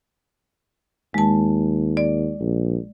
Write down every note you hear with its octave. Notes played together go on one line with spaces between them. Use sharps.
D#2 G#3 A5
D5
A#1